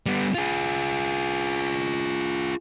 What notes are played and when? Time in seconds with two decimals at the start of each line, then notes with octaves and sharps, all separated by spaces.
0.06 G3 B3
0.35 F4 G#4